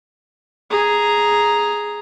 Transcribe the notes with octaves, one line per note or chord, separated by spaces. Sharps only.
G#4 A#5